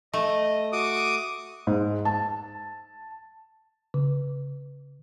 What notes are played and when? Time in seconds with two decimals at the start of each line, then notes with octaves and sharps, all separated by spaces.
0.14 A3 D#5
0.72 F#4 D6 D#6
1.67 G#2
2.05 A5
3.94 C#3